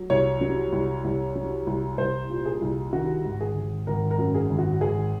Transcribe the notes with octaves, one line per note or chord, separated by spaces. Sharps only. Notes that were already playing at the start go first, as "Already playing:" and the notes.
Already playing: F#3
C2 C#5
F#3
C2
C2
F#3
C2
C2 C5
A#2
G#4
C2
D#3 F#4
G#1
G#4
G#1
G#1 A#4
A#4
F#2
G#4
G#1
F#4
G#1 G#4